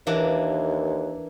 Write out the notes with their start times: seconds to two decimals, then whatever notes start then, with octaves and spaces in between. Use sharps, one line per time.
0.07 D#2 E3 A#3 D4